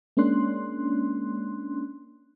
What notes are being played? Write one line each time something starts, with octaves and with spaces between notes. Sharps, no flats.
G#3 A#3 C#4 D4 C6 F#6